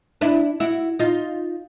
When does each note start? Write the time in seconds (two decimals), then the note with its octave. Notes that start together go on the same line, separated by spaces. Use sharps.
0.21 D4 E4
0.60 E4 F#4
0.99 D#4 F4